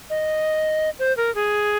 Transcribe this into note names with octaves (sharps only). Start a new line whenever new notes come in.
D#5
C5
A#4
G#4